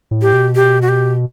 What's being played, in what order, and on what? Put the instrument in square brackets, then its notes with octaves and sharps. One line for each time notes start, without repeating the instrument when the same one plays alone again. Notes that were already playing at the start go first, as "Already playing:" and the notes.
[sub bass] A2
[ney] G4
[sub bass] B2
[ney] G4
F#4
G4